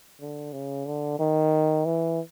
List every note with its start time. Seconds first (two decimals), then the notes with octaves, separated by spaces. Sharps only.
0.20 D3
0.53 C#3
0.86 D3
1.19 D#3
1.85 E3